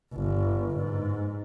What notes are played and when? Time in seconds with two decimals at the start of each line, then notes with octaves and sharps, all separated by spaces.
0.13 G1
0.76 G#2